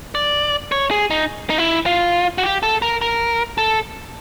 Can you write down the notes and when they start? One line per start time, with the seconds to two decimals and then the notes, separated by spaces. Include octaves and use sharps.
0.15 D5
0.72 C#5
0.91 G#4
1.11 D#4
1.50 D#4
1.58 E4
1.86 F4
2.38 F#4
2.43 G4
2.63 A4
2.82 A#4
3.01 A#4
3.58 A4